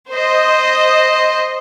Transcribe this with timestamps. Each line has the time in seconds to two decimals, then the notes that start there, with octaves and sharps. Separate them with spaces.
0.11 C5 D#5